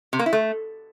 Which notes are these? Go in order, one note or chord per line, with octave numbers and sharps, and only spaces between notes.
C3
A#3
E4
A3